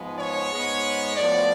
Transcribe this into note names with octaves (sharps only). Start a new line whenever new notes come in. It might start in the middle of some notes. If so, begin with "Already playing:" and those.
Already playing: G#2 F3 G#3 B3
C#5
G#2 G#3 B3
A2 F3 B3 D5